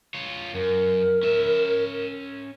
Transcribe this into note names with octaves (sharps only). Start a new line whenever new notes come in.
F4 C#5
F#2 A#4
C#4 E5